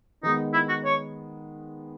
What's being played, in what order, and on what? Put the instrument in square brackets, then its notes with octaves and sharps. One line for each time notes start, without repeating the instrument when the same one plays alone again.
[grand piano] D#3 G#3 B3 [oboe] D#4
[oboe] E4
F#4
C#5